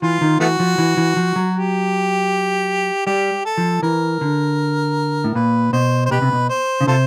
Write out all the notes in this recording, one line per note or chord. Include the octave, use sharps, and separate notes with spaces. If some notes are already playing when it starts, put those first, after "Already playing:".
E3 F4
D#3
E3 A3 B3 F#4
F3
E3
E3
F3
F#3
G4
G3 G4
A4
F3
E3 A#4
D3
A2
A#2 B4
B2 C5
C5
B2 G4 B4
C3
B2
C5
C#3
C3 F4 A4 C5